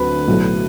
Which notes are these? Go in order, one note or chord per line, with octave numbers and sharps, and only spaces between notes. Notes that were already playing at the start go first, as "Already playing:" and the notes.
Already playing: D2 D3 F#3 C4 B4
B1 A2 F#3